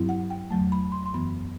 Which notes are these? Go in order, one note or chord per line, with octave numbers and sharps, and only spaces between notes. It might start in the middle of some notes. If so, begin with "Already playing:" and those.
Already playing: G2 F#3 C4 E4
F#5
G5
E2 D3 F#3 A3 A5
B5
C6
C6
F#2 E3 B3 B5